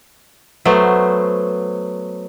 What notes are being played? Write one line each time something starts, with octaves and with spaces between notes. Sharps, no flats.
F#3 A3 B3 C5